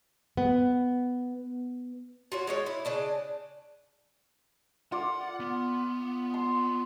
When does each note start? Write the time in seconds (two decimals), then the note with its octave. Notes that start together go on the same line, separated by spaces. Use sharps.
0.37 B3
2.32 F4 F#4 C#5
2.47 G#3 D#4 C#5
2.66 E4
2.85 C#3 D4 D#5
4.92 F4 D5 F#5
5.40 B3
6.34 C6